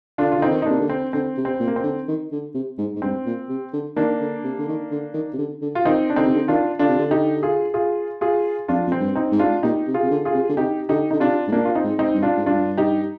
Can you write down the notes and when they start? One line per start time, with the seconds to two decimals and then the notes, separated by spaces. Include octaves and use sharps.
0.18 D3 D4 F4
0.32 F4
0.38 D3 C4 D#4
0.51 D#3
0.62 D#4
0.66 C3 A#3 D4
0.81 D3
0.89 C4
1.13 D3 C4
1.37 C3
1.45 C4
1.60 A#2
1.67 A#3
1.76 C4
1.83 D3
2.08 D#3
2.32 D3
2.54 C3
2.78 G#2
2.96 G#2
3.02 G2 C4
3.26 A#2
3.49 C3
3.73 D3
3.96 D#3 A#3 D4
4.21 D3
4.44 C3
4.59 D3
4.68 D#3
4.91 D3
5.14 D#3
5.33 C3
5.38 D3
5.62 D3
5.75 F4
5.85 D#3 C4 D#4
6.10 D4
6.16 D3 C4 D#4
6.26 C3
6.35 D3
6.48 D#3 D4 F4
6.79 D3 D4 F4
6.89 C3
6.99 D3
7.11 D#4 G4
7.43 F4 G#4
7.74 F4 G#4
8.21 F4 G#4
8.68 F2 D4 F4
8.87 F2
8.92 C4
9.00 G2
9.15 C4 D#4
9.32 G#2
9.39 D4 F4
9.63 A#2 D#4 G4
9.87 C3
9.94 F4 G#4
10.02 C3
10.10 D3
10.25 F4 G#4
10.33 C3
10.49 D3
10.57 C3 D#4 G4
10.89 D3 D#4 G4
11.11 D3 D#4
11.20 C3 D4 F4
11.48 G#2
11.52 A#2 A#3 D4
11.65 F4
11.75 C4 D#4
11.83 G#2
11.99 C4 D#4
12.15 G2
12.22 D4 F4
12.37 G#2
12.46 G2 D4 F4
12.77 D#4 G4